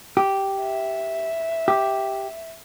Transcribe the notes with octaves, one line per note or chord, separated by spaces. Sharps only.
G4
E5
G4